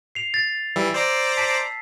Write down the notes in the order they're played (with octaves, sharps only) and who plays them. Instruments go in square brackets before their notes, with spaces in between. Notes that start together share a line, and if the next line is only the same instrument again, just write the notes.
[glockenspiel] C7 F7
A6
[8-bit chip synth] E3 G3 [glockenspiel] E6
[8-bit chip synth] C5 D5 A#5
[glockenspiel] A5 B6 C7